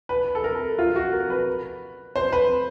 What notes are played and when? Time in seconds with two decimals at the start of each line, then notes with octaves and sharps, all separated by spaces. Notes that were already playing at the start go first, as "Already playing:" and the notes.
0.09 B4
0.35 A4
0.44 A#4
0.79 F4
0.96 F#4
1.12 A#4
1.30 B4
2.16 C5
2.32 B4